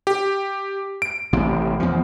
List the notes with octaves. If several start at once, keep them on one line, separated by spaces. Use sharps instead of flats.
G4
D7
A1 C3
E2 F3